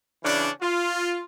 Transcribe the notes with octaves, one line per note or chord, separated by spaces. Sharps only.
C#3 E3 C#4 D4
F4